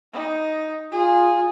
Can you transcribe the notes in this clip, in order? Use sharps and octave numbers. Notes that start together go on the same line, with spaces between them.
D#4
F4 G#4